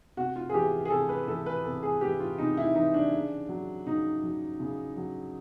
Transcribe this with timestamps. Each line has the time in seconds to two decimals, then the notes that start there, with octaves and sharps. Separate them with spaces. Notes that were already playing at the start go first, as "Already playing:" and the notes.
0.17 C3 F#4
0.36 F4
0.49 G#4
0.54 E3 G4
0.85 G#4
0.90 C3 A4
1.09 B4
1.28 E3 A4
1.46 B4
1.64 C3 A4
1.83 G#4
2.01 E3 G4
2.20 F4
2.38 C3 D#4
2.57 E4
2.75 E3 D#4
2.94 D4
3.13 C#3
3.49 F#3
3.86 C#3 D#4
4.23 F#3
4.60 C#3
4.97 F#3